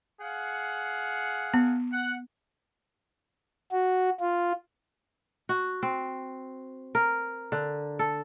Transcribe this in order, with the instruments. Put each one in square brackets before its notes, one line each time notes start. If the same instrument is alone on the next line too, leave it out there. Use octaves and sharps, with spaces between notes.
[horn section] G#4 F5 F#5
[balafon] B3
[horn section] F#5
[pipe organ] F#4
F4
[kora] F#4
C4
A#4
D3
A4